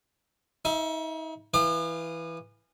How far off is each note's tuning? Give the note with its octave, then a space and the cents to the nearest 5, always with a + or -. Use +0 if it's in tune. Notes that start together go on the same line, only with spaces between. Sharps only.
D#4 +40 E5 +15
E3 +0 F5 -15 D#6 -45